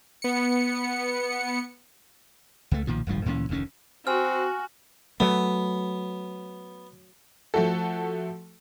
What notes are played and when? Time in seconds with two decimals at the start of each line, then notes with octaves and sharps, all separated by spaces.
0.22 B3 C#7
2.71 C#2 A3
2.87 B1 A#2 D#3 F3
3.07 D1 G#1 G2 F3
3.26 D2 A#2 E3 C#4
3.49 F1 D2 D#3 C#4
4.07 C4 F#4 G#5 F6
5.20 F#3 A3 B3
7.54 F3 A3 F#4 A4